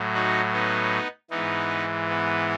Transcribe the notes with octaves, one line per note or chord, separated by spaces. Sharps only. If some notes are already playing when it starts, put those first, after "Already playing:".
Already playing: A2 F#3
D#4 F#4
B3 D#4
G#2 E3 B3 D#4
B3